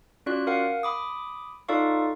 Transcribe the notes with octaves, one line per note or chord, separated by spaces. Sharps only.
C#4 F4 F#4 D5 F#6
A#4 F5 F#5
B5 D6 D#6
D#4 F4 A4 D5 F5 C#6